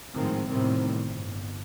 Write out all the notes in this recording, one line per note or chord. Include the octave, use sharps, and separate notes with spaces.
G#1 A2 D#3 F3 G#3 C4
E2 A2 C3 D#3 G3 C4
G1